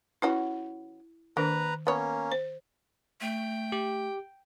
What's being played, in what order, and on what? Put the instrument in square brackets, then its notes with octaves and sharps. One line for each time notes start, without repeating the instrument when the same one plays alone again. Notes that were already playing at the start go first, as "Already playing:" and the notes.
[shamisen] E3 C#4 F#4 [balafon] E4
[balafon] D#3 [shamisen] A#3 D4 [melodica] B4 A#5
[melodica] A#3 C#4 [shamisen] B3 C#5
[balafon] C5
[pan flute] A3 [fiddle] G5
[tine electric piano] G4